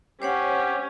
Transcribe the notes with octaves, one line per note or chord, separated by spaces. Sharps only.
C#4 G4 C5 C#5 F#5